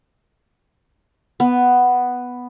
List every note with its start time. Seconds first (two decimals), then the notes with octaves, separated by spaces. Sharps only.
1.40 B3